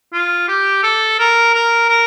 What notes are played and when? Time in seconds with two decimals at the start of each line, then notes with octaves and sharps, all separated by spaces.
0.13 F4
0.48 G4
0.83 A4
1.19 A#4
1.54 A#4
1.89 A#4